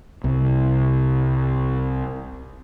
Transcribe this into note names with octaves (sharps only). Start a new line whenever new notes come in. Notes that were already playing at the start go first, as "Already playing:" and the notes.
C2 C3